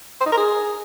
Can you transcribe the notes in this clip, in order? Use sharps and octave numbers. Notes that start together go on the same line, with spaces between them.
C5
D#4
A#4
G#4